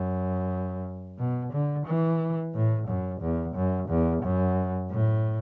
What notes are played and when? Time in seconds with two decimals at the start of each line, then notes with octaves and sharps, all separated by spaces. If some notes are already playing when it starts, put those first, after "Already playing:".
Already playing: F#2
1.19 B2
1.53 D3
1.86 E3
2.55 A2
2.88 F#2
3.21 E2
3.55 F#2
3.89 E2
4.23 F#2
4.91 A2